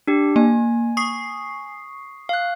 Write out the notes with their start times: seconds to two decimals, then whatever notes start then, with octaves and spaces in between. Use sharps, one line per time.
0.07 D4 G4
0.36 A#3 G#5
0.97 C#6 D#6 C7
2.29 F5 F#6